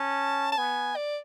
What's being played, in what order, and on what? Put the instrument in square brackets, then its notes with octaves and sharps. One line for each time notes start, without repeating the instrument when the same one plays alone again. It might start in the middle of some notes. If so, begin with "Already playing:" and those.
Already playing: [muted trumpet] C#4 [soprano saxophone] A5
[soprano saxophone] A5
[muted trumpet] B3 [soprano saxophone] G#5
[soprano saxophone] D5